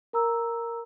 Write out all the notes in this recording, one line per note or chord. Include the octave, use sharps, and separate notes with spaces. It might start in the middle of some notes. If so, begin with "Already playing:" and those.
A#4 A#5 E6